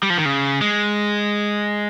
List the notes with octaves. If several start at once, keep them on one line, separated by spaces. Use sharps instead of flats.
G3
F3
D#3
C#3
G#3